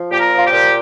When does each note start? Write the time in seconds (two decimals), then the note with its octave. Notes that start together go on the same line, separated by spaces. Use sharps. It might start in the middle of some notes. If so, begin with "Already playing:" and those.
Already playing: F3
0.10 A#2 G4
0.18 A#4
0.32 F3 F4
0.45 G4
0.51 A#2